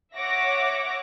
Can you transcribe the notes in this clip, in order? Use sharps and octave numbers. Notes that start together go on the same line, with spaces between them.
C#5 E5 F#5 D6 A#6